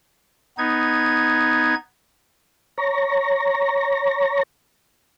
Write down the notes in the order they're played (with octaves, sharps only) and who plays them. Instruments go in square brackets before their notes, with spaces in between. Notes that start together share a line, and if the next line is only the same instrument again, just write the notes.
[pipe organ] B3 D#4 G#6
[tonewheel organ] C#5 A#5